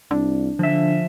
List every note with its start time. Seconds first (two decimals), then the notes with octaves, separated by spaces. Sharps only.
0.11 C2 D4
0.59 D3 F3 E5